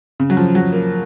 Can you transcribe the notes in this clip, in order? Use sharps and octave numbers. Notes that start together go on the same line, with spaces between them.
C#3
F#3
F3
F#3
A#3